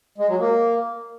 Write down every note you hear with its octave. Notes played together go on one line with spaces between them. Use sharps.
G#3
F#3
A#3